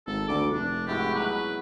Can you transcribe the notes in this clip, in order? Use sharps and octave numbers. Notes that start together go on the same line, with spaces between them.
G#1 A4
D2 D6
F1 D4
G#2 E4 F#4 G4
B2 F#3 B4